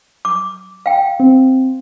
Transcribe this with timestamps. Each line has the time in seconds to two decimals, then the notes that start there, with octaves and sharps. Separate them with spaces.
0.25 D6
0.86 F5 G5
1.20 C4